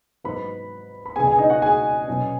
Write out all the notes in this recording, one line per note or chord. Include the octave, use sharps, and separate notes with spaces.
G#2 F#3 B3 B4 B5
B5
C#2 B2 B3 G#4 G#5
G#4 G#5
D#4 D#5
F#4 F#5
G#4 G#5
B2 F#3 C#4